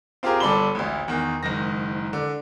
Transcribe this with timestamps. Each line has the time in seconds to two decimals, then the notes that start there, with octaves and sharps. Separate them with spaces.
0.23 C4 F4 G4 G#4 A#4 C6
0.40 G1 A4 D5 B5 C6 G7
0.75 A1 D2
1.08 E2 D#3
1.43 F#1 G#2 D#3 A#6
2.13 D3